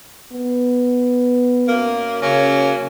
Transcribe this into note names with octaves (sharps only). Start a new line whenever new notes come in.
B3
F#2 A#3
C#3 F#3 A#3 C#4